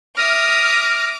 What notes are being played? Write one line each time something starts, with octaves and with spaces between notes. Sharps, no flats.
E5 D6 D#6 F6 A#6